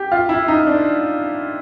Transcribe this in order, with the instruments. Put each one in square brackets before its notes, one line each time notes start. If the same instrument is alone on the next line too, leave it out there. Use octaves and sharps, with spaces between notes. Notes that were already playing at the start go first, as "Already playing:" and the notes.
Already playing: [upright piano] G4
F4
E4
D#4
D4